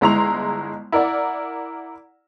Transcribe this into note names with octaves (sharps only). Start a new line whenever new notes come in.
G1 G#3 E4 A#5 C6 F7
E4 A#4 D5 F#5